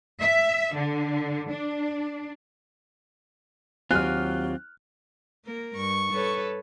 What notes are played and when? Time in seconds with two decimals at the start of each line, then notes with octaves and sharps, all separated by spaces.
0.20 E5
0.75 D3
1.50 D4
3.91 D#2 F#3 C4 F4 G4 G#5 F6 F#6
5.45 A#3 A#4
5.76 G2 C#6
6.13 A4 B4 C#5